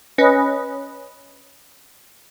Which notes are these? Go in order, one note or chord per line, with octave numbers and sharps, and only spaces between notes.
C#4 B4 D#5